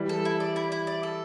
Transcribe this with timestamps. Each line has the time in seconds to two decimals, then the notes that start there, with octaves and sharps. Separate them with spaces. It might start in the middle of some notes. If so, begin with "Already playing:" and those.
Already playing: E3 G3
0.09 A4
0.25 E4
0.40 D5
0.56 E4
0.72 E4
0.87 D5
1.03 A4